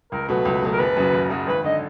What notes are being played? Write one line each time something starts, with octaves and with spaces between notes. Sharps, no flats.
C#2 A#4
B2 F#3 A3 B4
C#2
B2 F#3 A3
A#4
F#1 B4
F#2 C#3 F#3
F#1
F#2 C#3 F#3
G#1 B4
D3 D#5